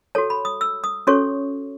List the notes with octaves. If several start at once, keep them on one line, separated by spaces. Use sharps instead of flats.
F#4 A4 C#5 A5
B5
D#6
E6
D#6
C#4 F#4 A4 C#5 C#6